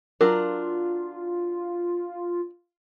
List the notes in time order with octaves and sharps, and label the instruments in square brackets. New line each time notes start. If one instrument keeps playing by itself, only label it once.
[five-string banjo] F#3 D4 A#4 [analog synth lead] F4